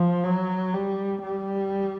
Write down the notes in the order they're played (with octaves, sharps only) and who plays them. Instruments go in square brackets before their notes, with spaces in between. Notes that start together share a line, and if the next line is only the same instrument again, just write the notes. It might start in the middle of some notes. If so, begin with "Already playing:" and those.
Already playing: [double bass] F3
F#3
G3
G3